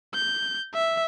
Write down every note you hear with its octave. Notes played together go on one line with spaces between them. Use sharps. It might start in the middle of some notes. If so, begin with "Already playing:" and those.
G6
E5